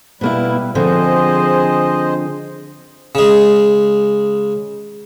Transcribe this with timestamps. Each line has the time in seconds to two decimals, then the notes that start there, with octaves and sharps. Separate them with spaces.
0.21 B2 G3 A#3 E4 B4
0.75 D3 F3 C4 G#4 C5 D#5
3.15 C#3 G#3